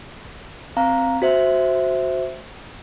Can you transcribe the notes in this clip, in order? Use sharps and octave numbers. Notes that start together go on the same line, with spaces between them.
C4 F5 A#5
F#4 C5 E5